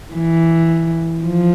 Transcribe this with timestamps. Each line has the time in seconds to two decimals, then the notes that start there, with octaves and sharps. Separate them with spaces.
0.15 E3
1.24 F3